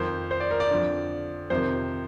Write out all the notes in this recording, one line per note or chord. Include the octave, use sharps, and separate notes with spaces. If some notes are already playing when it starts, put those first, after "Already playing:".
Already playing: F2 D#3 C5
C5
D5
A#4
D5
F2 D3
F2 C3 D#3 C5